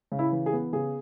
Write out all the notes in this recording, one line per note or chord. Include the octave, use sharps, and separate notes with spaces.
C#3
E4
E3
G#4
B3
C#3 G#4